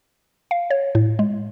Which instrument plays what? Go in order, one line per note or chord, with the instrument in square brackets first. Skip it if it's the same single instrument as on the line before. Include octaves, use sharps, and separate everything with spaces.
[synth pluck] F5
C#5
A2
G#3